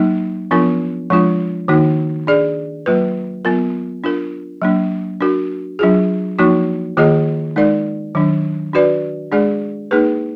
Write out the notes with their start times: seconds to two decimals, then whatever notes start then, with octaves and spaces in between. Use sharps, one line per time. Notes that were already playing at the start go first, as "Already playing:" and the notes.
Already playing: F#3 A#3 D#4
0.51 F3 B3 D4 F4 A#4
1.10 F3 G#3 D4 F4
1.68 D#3 A#3 D#4 F#4
2.27 D4 G#4 D5
2.86 F#3 A#3 F4 B4
3.45 F#3 B3 F4 A#4
4.04 D4 F4 A#4
4.62 F#3 A#3 D4
5.21 D4 F#4 A#4
5.79 F#3 D4 F4 G#4
6.39 F3 A#3 D#4 F#4
6.97 D#3 A#3 F4 G#4 D#5
7.56 G#3 D#4 A#4 D5
8.15 D#3 F#3 D4
8.73 D4 F#4 B4 D5
9.32 G#3 D4 G#4 D5
9.91 A#3 D#4 G#4 B4